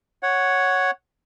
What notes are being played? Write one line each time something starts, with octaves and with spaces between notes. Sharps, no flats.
C#5 F#5